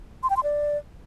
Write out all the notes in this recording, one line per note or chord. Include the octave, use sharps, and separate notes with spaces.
C6
G5
C6
D5